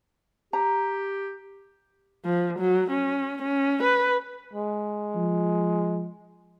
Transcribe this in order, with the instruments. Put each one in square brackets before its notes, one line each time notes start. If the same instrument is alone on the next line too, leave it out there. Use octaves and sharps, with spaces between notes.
[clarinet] G4 [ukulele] A#5
[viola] F3
F#3
C#4
C#4
B4
[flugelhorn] G#3
[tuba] F3